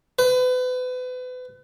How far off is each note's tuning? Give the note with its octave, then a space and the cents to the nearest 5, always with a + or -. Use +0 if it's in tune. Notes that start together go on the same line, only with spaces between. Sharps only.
B4 +35